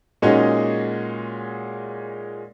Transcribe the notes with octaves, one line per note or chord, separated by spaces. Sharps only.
A#2 G#3 C#4 D#4 F#4 G#4